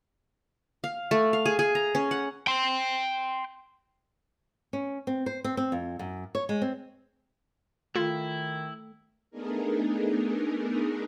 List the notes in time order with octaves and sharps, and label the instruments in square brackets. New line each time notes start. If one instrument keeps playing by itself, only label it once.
[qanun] F5
A3
F5
G#4
G#4
A#5
C#4
F#5
[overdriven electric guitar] G5 C6
[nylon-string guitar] C#4
C4
C5
C4
C4
F2
F#2
C#5
G#3
C4
[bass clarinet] D#3 [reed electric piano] A3 [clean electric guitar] E4 [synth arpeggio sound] F4
[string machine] A3 B3 D4 D#4 G#4 A#4